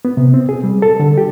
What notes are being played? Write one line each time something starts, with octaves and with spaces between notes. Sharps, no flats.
B3
C3
C4
G#4
G3
A4
D3
G4